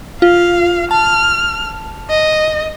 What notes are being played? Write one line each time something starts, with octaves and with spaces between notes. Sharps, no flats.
F4 F5
A5 F6
D#5